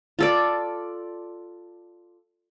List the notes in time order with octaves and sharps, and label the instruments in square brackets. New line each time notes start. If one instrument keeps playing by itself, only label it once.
[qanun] F4 A4 D5